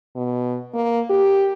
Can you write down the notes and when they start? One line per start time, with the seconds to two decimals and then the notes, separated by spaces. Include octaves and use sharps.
0.16 B2
0.74 A#3
1.10 G4